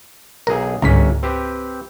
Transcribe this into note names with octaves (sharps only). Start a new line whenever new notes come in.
B1 G#4 A#4
G1 C#2 G#2 C#4 A#5 B6
C4 G4 B4